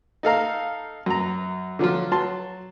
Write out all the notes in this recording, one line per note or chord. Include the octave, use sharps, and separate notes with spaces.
D#4 A4 F5 A#5
F#2 A#5
D3 F3 F#3 F4
F#3 A5 C6